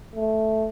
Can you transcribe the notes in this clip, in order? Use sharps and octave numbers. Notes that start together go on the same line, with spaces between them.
A3